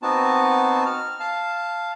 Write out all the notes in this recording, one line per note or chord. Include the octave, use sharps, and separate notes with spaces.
B3 C4 D#4 F#4 A5
F6
F5 A5